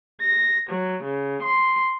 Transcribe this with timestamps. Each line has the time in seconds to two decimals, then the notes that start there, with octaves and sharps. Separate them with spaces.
0.19 A#6
0.68 F#3
1.03 C#3
1.42 C6